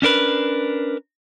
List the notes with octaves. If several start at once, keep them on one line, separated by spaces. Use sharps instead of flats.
C#4 D4 A#4 B4